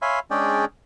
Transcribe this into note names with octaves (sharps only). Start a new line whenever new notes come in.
C#5 E5 F5 G#5 B5 C6
G#3 C#4 D4 G#4 D5 G5